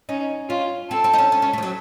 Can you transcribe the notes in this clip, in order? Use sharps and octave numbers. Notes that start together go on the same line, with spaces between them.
C#4 D#4
C#4 F4
C4 A4
C4
D#4
C#4
C#4
C#4
A3
F3
F#3